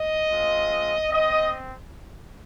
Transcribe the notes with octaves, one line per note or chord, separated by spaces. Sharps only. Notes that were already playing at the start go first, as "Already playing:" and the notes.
Already playing: D#5
G#3 C4 F4
C4 D#5